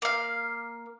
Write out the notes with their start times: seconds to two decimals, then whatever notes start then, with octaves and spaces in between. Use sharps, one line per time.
0.02 A#3 F5